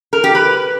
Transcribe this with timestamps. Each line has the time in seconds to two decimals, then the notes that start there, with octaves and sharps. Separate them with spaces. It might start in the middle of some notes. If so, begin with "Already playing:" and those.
0.13 A#4
0.24 G4
0.35 B4